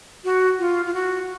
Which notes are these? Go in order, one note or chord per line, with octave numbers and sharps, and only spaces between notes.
F#4
F4
F4
F#4